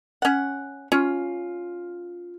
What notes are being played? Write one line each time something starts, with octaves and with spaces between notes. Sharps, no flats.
C#4 F#5
C#4 F4